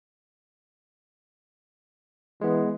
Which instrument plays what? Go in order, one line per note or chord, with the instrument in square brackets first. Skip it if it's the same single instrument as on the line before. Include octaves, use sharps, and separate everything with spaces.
[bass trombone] E3 [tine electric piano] G#3 B3